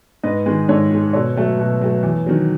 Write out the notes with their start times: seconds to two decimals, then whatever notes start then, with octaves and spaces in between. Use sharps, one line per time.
0.23 G#2 B4 D#5
0.46 D#3 G#3
0.69 G#2 A4 C#5
0.91 D#3 G#3
1.13 B2 A4 C#5
1.36 F#3 A3
1.58 B2
1.81 F#3 A3
2.03 E2
2.26 D#3 F#3